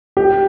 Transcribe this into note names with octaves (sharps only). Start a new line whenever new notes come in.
G4